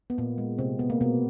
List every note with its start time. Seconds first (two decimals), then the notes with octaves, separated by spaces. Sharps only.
0.10 B3
0.18 A#2 A#3
0.38 G#3
0.58 C3 C4
0.79 B3
0.90 A#3
1.01 B2 B3